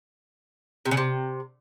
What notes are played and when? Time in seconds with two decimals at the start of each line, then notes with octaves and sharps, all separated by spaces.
0.85 C3
0.91 C#3
0.97 C3